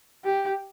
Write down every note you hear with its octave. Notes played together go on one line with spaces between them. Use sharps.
G4